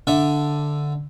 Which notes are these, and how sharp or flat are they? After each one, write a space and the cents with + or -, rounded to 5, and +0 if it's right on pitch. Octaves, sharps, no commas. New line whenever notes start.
D3 +0 E5 +0